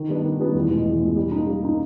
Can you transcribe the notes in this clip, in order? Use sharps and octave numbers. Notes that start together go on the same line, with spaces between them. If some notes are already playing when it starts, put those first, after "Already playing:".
Already playing: D#3
G3 B3 D4
D#3
G3 B3 D4
E2
B2 G#3
E2
B2 G#3
G3
A#3 D#4
G3
A#3 D#4